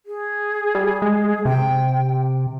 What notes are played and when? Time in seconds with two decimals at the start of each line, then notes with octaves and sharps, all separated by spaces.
0.06 G#4
0.75 G3
1.02 G#3
1.45 C3 G5